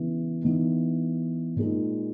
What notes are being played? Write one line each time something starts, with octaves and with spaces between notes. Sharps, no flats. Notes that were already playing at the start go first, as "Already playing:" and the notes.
Already playing: C#3 E3 B3
E3 B3 D#4
A#2 G#3 D#4